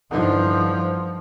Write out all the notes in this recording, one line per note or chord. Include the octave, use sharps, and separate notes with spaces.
G2 D3 E3 F3 D#4